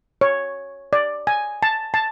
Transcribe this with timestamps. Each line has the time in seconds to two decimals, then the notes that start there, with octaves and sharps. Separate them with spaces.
0.21 C#5
0.93 D5
1.27 G#5
1.63 A5
1.94 A5